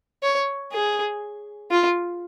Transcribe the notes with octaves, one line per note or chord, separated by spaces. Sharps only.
C#5
G#4
F4